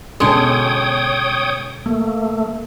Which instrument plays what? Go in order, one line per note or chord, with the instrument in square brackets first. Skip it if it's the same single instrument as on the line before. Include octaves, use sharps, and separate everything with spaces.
[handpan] B2 C#4 A4 [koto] D3 G#3 [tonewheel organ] C#5 G5 D#6
[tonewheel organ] A3 [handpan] A#3